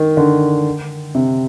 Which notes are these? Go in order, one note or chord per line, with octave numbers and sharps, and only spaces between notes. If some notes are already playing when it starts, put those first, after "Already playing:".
Already playing: D#3
D3
C3